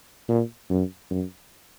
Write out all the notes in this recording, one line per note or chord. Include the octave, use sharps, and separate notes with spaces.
A#2
F#2
F#2